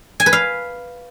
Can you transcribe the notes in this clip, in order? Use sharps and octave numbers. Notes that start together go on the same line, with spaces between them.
G#5
B4
F5